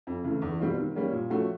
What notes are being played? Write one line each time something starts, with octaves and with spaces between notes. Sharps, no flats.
F2
C#3 E3 A3
E2
B2 G3 C4 F4
D#3
G3 A#3 C#4
A#2
F3 A3 C#4 F#4